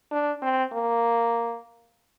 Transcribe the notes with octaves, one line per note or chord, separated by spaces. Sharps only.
D4
C4
A#3